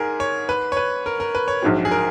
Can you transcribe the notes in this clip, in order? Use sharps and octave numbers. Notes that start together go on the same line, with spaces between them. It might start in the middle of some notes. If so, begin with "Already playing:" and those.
Already playing: G#2 G#4 A#4
C#5
B4
C#5
B4
A#4
A#4
B4
C#5
A#1 G#2 F#3
G#4
A#4